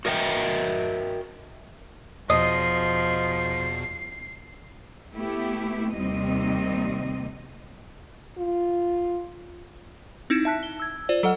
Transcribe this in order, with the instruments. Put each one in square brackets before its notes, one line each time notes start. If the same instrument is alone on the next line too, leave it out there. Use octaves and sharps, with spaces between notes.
[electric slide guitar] F#4 A#4 D#5 E5 G5
[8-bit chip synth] E2 B2 [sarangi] F3 [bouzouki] D#5 [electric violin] C7
[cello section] A3 B3 E4 G4
D#2 C3 G3 C4 D#5
[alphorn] F4
[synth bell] C4 D#4 E4 E7
E5 A5 F#6 B6
G7
E6 G#6
F4 C5 D5
F#3 A4 D#5 F#5 F6